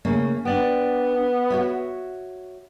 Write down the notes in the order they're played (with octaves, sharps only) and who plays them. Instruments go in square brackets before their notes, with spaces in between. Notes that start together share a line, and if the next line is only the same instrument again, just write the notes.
[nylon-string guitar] C#3 A3 A#3
[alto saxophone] B3 [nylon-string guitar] D4 D5 G5
[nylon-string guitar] F#4 C#5 E5